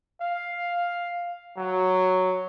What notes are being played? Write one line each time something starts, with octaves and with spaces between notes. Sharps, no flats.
F5
F#3